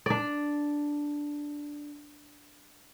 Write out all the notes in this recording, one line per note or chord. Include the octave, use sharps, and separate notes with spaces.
D4 D5